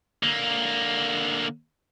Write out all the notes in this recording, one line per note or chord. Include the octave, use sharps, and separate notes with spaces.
D3 A#3